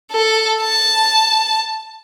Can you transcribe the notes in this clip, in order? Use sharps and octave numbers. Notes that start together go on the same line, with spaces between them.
A4
A5